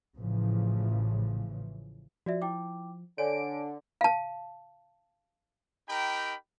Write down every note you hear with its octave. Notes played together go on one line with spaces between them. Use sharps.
A1 A2 C#3 E3 F3
F3 F#4 D5 E5
E4 G5 D6
D3 C#5 G#5 D7
F5 A5
D#4 G4 A#4 G5 B5